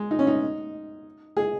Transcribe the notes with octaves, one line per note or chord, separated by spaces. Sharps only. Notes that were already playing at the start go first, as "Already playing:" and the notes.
Already playing: G#3
D#4
C#4
D#4
G#4